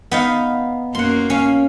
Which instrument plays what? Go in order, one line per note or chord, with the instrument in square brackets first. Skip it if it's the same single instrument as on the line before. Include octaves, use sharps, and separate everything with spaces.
[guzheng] B3 D#4 F5
[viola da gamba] F#2 A#3 [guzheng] F#5 C6
[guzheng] C#4 F5